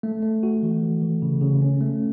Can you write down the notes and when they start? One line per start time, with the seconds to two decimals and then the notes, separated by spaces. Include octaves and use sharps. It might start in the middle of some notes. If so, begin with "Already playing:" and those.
0.03 A3
0.23 A3
0.43 F#4
0.62 E3
0.82 E3
1.01 E3
1.22 C#3
1.41 C#3
1.62 C#4
1.81 A3